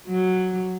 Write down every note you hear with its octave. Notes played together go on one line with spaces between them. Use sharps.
F#3